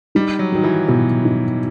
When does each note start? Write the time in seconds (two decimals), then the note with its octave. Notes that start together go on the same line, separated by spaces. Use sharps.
0.15 G3 D#4
0.39 F#3
0.52 D#3 F#3
0.64 E3
0.88 B2 E3
1.25 D#4